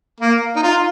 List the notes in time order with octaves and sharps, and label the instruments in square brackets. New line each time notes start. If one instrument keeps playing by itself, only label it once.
[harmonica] A#3
D#4
F4